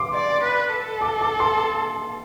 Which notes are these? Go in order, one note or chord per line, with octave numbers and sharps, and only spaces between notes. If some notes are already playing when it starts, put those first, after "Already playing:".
Already playing: C6 D6
D5
B4
A4
D6
D6
C6